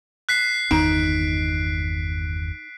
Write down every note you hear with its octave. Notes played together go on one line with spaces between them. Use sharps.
F#6 B6 C7
G1 E2 D#3 D#4 D7